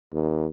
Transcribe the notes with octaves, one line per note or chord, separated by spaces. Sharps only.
D#2